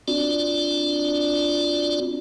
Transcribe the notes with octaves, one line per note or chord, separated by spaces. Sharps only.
C4 D4 F4 F#4 D5